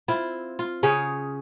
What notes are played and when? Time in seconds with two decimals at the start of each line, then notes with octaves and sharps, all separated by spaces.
0.08 C4 E4 F4
0.59 F4
0.83 C#3 C#4 G#4